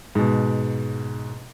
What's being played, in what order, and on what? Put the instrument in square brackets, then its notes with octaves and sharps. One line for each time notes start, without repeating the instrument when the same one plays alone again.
[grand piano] G#2 B2